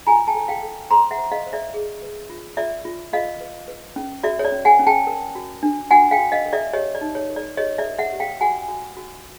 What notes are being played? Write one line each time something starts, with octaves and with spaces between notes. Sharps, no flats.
F4 G#5 A#5
G5 A5
A4
F5 G5
A4
C5 A#5 C6
E5 F#5
C5
D#5 F5
C5
D5 E5
G#4
B4
F4
F4 D5 E5
F4
F4 D#5 F5
B4
B4
C#4
F#4 D5 E5
C#5
D5
C#4
F#5 G#5
C#4
G5 A5
A#4
F#4
D4
F#4 F#5 G#5
F5 G5
F#4
D#5 F5
A#4
D5 E5
G4 C#5 D#5
D5
D#4
C#5
A#4
D5
G4 C#5 D#5
D5 E5
A#4
E5 F#5
G4
F5 G5
F#4 F#5 G#5
F#4
F#4